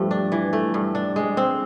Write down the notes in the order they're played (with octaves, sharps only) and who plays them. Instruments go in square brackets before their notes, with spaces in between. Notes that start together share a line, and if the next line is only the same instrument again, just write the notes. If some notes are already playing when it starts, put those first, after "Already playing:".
Already playing: [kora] G2 A3 [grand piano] F3 G3
[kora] D4
E3
A3
G2
D4
G#3
C4